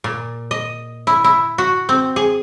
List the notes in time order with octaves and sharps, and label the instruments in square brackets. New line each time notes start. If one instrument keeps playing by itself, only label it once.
[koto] A#2
D#5
E4
E4
F#4
C4
G#4